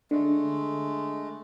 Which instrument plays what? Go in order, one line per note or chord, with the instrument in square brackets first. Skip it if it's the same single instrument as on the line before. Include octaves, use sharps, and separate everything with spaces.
[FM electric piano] D3 [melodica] G#3 A3